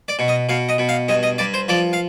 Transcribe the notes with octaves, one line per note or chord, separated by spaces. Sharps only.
D5
B2
D#5
B2 F5
D#5
B2
F5
G2 D#5
D#5
G2 D5
C5
F3 D5
F5